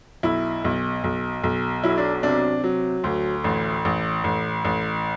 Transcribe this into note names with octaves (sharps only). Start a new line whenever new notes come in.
B1 E4
B1
B1
B1
F#3 E4
D4
C3 D4
F#3
D2
A1
A1
A1
A1